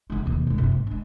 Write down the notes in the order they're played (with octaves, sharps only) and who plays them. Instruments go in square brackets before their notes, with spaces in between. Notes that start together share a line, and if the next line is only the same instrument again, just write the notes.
[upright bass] C#3 G#3
D#2 B2
B2 G#3
F#1 C3
G#2
G#3 D4